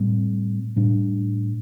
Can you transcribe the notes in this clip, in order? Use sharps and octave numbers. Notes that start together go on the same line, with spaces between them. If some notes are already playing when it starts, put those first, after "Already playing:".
Already playing: A2 G3 C4
A2 G3 D4